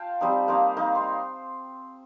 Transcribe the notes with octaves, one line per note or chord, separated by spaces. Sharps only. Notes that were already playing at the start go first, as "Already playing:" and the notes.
Already playing: F4 F5 G5 A5
G3 C4 D#4
A#3 D#4 C6
A#3 D#4
C6